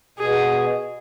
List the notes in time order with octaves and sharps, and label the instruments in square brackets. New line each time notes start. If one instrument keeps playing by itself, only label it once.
[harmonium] B2 [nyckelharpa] G#4